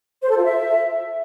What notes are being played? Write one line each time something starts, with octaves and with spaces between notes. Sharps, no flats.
C5
A4
F4
E5